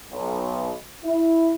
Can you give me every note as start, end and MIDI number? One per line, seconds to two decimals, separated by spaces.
0.12 0.73 35
1.05 1.55 64